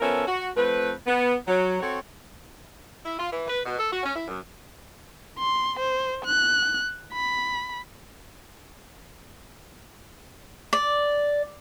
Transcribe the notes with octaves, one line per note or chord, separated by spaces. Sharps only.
F3 B3 C#4 A4 A#4 E5
F#4
F3 A3 C4 B4
B3
F#3
C4 F#4 A4 C#5
E4
F4
E3
B4
B2
A4
F#4
C#4
E4
F#2
C6
C5
F#6
B5
D5